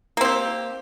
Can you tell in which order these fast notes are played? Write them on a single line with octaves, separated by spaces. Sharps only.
A#3 C4 G4